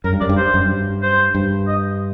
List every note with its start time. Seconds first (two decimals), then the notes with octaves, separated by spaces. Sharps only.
0.04 F#2 A#4
0.13 G2
0.21 F#2 D5
0.29 G2
0.37 C5
0.54 F#2
0.61 G2
1.03 C5
1.35 G2
1.67 D#5